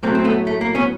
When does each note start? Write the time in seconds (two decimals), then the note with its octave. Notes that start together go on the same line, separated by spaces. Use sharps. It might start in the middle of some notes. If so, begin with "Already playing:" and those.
0.03 A2 F#3 A3 A#3 C4
0.15 C4
0.25 A3 B3
0.47 A3
0.61 A#3
0.75 B3 C#4